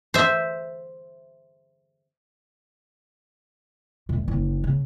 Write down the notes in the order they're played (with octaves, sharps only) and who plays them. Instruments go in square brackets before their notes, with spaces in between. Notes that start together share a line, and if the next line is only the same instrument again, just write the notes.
[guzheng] C5 E5
[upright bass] E1 A2
F#1 D4
C#3